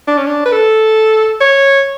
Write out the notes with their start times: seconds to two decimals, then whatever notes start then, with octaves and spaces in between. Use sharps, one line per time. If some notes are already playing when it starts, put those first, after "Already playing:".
0.08 D4
0.17 C#4
0.27 D4
0.45 B4
0.52 A4
1.40 C#5